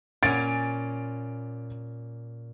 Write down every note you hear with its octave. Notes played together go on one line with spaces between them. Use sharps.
A#2 C#4 G#5 A6 D7